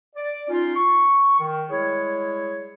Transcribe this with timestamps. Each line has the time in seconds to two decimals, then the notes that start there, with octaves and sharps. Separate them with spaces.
0.16 D5
0.49 C#4 D#4 F4
0.76 C#6
1.39 D#3
1.70 G3 G#3 E4 G#4 C#5